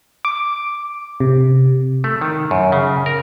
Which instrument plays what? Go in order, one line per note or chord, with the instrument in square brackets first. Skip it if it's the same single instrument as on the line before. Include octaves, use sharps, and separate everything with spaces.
[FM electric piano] D6
C3
[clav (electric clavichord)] A3
D#3
F#2
C#3
A#4